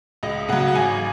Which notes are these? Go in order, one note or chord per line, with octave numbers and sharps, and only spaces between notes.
C#2 D#5
C#3 F#3 F#5
F#5
G#1 G#5